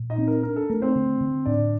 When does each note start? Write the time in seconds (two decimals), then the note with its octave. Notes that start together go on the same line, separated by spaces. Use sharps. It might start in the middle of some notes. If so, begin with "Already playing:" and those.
Already playing: A#2
0.10 D#4 D#5
0.18 C4
0.28 A#4
0.43 D4 A#4
0.56 A4
0.69 A3 A#4
0.82 C4 C5
0.95 D3
1.21 D3
1.45 A2 D4 D5